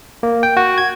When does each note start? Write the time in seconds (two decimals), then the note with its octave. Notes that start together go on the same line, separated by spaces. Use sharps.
0.23 A#3
0.43 G5
0.57 F#4
0.78 G#6